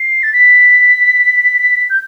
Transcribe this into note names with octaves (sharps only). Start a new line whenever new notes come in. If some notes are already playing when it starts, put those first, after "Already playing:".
Already playing: C7
A6
B6
G6